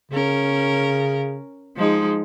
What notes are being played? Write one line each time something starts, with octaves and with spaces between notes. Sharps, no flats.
C#3 C#4 A#4
F3 G#3 D#4